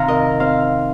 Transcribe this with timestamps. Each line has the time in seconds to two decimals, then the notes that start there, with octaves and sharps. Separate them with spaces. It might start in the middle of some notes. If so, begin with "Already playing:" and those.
Already playing: C3 D#3 F5 A#5
0.08 A#4 D#5
0.40 C4 C5 F5